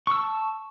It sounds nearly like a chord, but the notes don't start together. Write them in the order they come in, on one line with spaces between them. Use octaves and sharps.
C#6 E6 A5